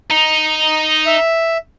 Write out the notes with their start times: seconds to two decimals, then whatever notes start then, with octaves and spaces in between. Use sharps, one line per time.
0.11 D#4
1.06 E5